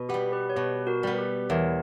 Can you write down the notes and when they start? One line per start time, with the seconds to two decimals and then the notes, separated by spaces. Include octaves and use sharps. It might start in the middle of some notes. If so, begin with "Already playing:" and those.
Already playing: B2
0.09 G3 B3 G4
0.32 G4 B4
0.50 C#5
0.56 B2 G4 B4
0.87 F#4 A#4
1.03 G3 B3
1.18 G4 B4
1.49 E2 A#4 C#5